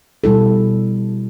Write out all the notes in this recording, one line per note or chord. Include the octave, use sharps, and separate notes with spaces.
B2 G3 E4 A4